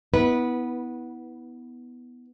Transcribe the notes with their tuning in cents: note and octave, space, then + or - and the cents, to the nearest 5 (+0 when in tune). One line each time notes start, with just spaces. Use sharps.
B3 +0 E4 -30 B4 -15